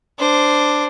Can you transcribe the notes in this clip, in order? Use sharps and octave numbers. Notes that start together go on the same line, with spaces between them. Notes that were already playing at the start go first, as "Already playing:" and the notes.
D4 C5